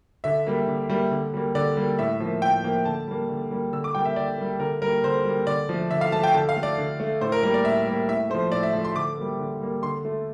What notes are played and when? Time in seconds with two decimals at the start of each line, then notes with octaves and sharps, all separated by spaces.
0.24 D3 E5
0.47 G3 A#3
0.67 D3
0.89 G3 A#3
1.11 D3
1.34 G3 A#3
1.55 D3 D5
1.77 G3 A#3
1.99 A2 E5
2.20 F3 A#3
2.42 A2 G5
2.64 F3 A#3
2.85 D3 A5
3.08 G3 A#3
3.29 D3
3.51 G3 A#3
3.73 D3 E6
3.84 D6
3.95 G3 A#3 G5
4.05 E5
4.16 D3 D5
4.38 G3 A#3
4.60 D3 A#4
4.82 G3 A#4
4.87 A#3
5.04 D3 C5
5.25 G3 A#3
5.47 D3 D5
5.69 F3 A3
5.91 D3 E5
6.01 F5
6.12 F3 A3 A5
6.23 G5
6.34 D3 A5
6.49 F5
6.57 A3
6.63 D5
6.78 D3
7.00 A3
7.21 A2 C5
7.32 A#4
7.43 G3 A#3 A#4
7.54 D5
7.64 A2 E5
7.87 G3 A#3
8.08 A2 E5
8.30 A3 C5
8.35 F3
8.52 A2 D5
8.63 E5
8.73 F3 A3
8.84 C6
8.95 D3 D6
9.18 G3 A#3
9.39 D3
9.61 G3 A#3
9.83 D3 C6
10.05 A3